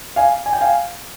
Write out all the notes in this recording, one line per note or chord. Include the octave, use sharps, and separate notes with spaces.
F5 G#5
G#5
G5
F5 G#5